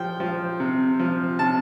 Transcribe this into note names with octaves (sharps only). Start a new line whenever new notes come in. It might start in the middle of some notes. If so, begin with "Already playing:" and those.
Already playing: F3 G5
F3
C3
F3
C3 A5